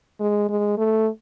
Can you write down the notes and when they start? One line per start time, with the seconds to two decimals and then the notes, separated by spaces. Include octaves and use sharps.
0.20 G#3
0.49 G#3
0.78 A3